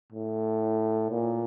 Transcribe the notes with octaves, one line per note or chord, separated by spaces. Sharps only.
A2
A#2